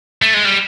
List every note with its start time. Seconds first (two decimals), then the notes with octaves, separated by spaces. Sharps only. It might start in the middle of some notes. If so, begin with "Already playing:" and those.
0.22 A3
0.34 G#3
0.45 G3